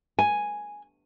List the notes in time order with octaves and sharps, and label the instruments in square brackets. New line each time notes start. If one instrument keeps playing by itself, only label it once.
[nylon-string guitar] G#5